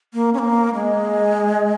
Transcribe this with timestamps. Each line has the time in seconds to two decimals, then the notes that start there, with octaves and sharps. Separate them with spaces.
0.14 A#3
0.34 C#4
0.39 A#3
0.74 G#3